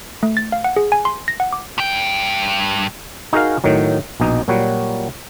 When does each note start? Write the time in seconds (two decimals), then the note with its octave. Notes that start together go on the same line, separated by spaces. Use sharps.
0.23 A3
0.37 A6
0.52 F5
0.64 F#5
0.76 G#4
0.92 G#5
1.05 C6
1.28 A#6
1.40 F#5
1.53 D6
1.78 G2 G5
3.33 D#4 F#4 G#4 A#4 D#5 F5
3.64 A2 D#3 F#3
4.20 A#1 B2 D#4
4.48 A#2 F#3 G3 F#4